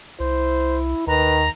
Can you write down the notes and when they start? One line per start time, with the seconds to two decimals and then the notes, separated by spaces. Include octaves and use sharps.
0.20 C2 E4 C5
1.07 D#2 D#3 B4 A#5